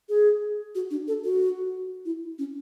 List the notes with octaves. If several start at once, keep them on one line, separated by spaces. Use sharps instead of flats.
G#4
F#4
D4
A4
F#4
E4
C#4